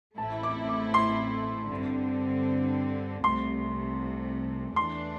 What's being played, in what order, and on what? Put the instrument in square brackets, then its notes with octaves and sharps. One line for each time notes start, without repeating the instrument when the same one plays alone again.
[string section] A1 A2 A3 C4 E4 [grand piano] A5
[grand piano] D6
D6
C6
[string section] G2 D3 C4
[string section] C2 C3 A3 [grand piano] C6
[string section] E2 E3 A3 D4 [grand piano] C6